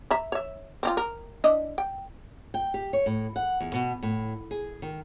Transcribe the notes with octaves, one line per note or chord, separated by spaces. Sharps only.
E5 A#5 B5
C#5 E5
C4 D#4 F4
A#4
D4 E4 D#5
G5
G5
G4
C#5
A2
F#5
E2
B2
A2
G#4
D#3